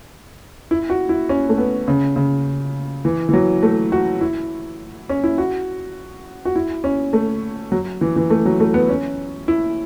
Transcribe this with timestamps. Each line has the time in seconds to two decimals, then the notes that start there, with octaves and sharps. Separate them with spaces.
0.71 E4
0.90 F#4
1.09 E4
1.29 C#4
1.49 A3
1.58 B3
1.88 C#3
2.16 C#3
3.05 E3
3.29 E3
3.33 F#3
3.63 A3
3.92 F#4
4.21 E4
5.09 C#4
5.24 E4
5.38 F#4
6.45 F#4
6.56 E4
6.84 C#4
7.13 A3
7.72 F#3
8.01 E3
8.16 E3
8.30 A3
8.45 F#3
8.60 A3
8.74 B3
8.89 C#4
9.48 E4